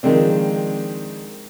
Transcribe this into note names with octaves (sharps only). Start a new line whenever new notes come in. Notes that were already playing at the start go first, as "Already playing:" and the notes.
D#3 F3 G#3 C4 D4